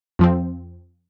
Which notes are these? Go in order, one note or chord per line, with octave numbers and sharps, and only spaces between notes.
F2 F3 C4